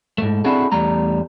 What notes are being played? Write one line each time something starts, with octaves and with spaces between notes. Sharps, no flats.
G#2 A3
C4 D4 E4 F#4 G#4 A4
E2 G3 A3 A#5